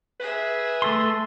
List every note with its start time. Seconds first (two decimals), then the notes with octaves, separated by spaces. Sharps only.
0.20 G#4 B4 E5
0.82 A3 A4 C6